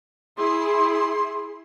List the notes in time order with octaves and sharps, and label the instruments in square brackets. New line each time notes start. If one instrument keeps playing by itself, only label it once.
[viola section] E4 G#4 [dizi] C6